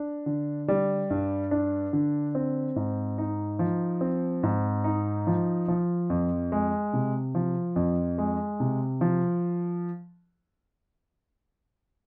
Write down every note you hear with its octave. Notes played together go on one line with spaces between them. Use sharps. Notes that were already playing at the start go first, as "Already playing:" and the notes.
Already playing: D4
D3
G3
G2
D4
D3
C4
G#2
D#4
F3
C4
G#2
D#4
F3
F3
F2
G#3
C3
F3
F2
G#3
C3
F3